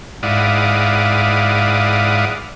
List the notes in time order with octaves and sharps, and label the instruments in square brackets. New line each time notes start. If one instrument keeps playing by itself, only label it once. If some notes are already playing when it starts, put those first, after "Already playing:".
[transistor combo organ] G#2 E4 D5 F5 F#5 D#6